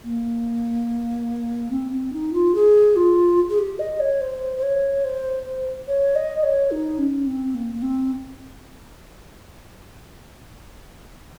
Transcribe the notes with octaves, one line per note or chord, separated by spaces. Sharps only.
A#3
C4
C4
D#4
F4
G#4
F4
G#4
G4
D#5
C#5
C5
C5
C#5
C5
C#5
D#5
C#5
D#4
C#4
C4
A#3
A#3
C4